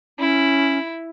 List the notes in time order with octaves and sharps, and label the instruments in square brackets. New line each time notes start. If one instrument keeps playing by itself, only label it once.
[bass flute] C#4 [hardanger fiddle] E4